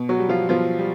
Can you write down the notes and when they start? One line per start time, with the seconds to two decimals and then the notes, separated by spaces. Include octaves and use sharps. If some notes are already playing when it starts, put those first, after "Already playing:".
Already playing: B2
0.09 F#3 F#4
0.19 G3
0.29 F3 F4
0.49 B2 F3 F4
0.79 G3